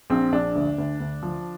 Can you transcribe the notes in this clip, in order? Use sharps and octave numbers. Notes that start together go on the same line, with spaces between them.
A#1 C4
A#1 D4
D2
D2
D2
F3